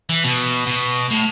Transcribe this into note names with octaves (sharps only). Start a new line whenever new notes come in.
E3
B2
B2
A2